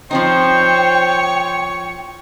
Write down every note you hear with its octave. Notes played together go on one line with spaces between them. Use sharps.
F3 C4 D#4 C5 C#5 G5